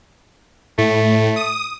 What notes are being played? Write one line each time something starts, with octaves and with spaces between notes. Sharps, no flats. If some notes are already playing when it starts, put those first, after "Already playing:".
A2 A3
D#6